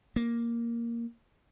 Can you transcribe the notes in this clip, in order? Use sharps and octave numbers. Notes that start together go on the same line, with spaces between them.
A#3